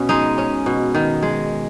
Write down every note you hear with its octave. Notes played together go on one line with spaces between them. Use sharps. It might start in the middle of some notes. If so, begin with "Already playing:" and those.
Already playing: B2 B3 C#4
G#3 D#4
C#4
B2
D#3
G#3